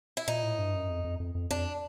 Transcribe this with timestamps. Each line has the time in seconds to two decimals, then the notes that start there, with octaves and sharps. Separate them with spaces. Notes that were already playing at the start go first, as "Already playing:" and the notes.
0.17 E4
0.28 A#2 D#4
0.43 A2
0.59 G2
0.74 F#2
0.90 F2
1.04 F2
1.20 F2
1.35 F2
1.50 F2 D4